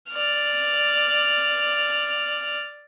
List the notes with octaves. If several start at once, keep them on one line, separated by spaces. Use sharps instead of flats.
D5 F6